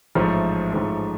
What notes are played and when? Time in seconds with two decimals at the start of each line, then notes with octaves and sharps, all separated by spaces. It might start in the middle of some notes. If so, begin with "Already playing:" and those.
0.15 A1 G#2 F3 A3
0.73 A1 G#2 F3 A3